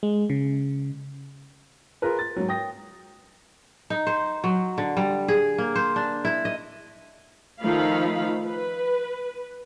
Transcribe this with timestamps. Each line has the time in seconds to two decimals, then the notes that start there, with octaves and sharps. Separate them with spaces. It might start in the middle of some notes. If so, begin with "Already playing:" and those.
0.03 G#3
0.30 C#3
2.02 F4 G#4 A#4 B4
2.19 A6
2.36 G#2 F#3
2.48 G5 D#6 A#6
3.90 D#4
4.07 C5
4.44 F#3
4.78 D3
4.97 G3
5.28 G#4
5.58 A#3
5.76 C5
5.96 D4
6.25 E4
6.45 D#5
7.63 D#3 F3 A3 D#4 F5 B5
8.46 B4